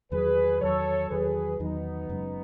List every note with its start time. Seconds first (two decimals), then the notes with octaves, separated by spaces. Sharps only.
0.12 E2 D#3 F#3 G#4 B4
0.61 E2 D#3 F#3 A4 C#5
1.10 E2 D#3 F#3 G#4 B4
1.60 E2 D#3 F#3 B3 D#4
2.09 F#1 F#2 C#3 G#3